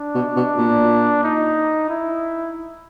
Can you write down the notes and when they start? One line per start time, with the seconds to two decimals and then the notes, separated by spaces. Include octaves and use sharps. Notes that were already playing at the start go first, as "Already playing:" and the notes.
Already playing: D4
0.14 B2
0.36 B2
0.58 A#2
1.24 D#4
1.89 E4